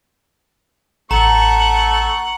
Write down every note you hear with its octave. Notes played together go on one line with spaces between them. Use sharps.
A1 A3 A4 F#5 A#5 C#6